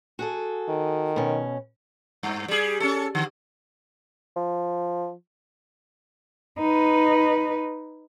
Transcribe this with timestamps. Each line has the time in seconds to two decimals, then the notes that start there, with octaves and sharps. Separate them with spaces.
0.19 F#4 G#4 A4
0.69 D#3
1.16 B2 C#4
2.23 G2
2.48 G3 G#4
2.80 C#4 A4
3.15 D3
4.36 F3
6.59 D#4 B4